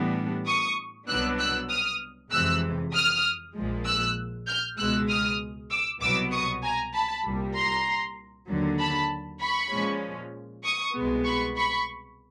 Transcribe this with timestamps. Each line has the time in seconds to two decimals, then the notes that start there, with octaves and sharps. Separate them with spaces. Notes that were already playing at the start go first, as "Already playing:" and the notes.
Already playing: A2 E3 G3 B3 D4
0.47 C#6 D#6
1.08 C2 B2 F#3 B3 D4 E6 F#6
1.39 E6 F#6
1.70 D#6 F6
2.32 F2 C3 E3 G#3 E6 F#6
2.93 D#6 F6
3.55 A#1 A#2 F3 G#3
3.86 E6 F#6
4.47 F6 G6
4.78 C#2 B2 G#3 E6 F#6
5.09 D#6 F6
5.71 D6 E6
6.01 C2 B2 F#3 B3 D6 E6
6.32 C#6 D#6
6.64 G#5 A#5
6.94 A5 B5
7.25 C2 A#2 G3
7.56 A#5 C6
8.48 D#2 D3 F#3
8.79 A5 B5
9.41 B5 C#6
9.71 A#2 F3 G#3 C#4
10.64 C#6 D#6
10.95 C2 B2 G#3 B3
11.26 B5 C#6
11.57 B5 C#6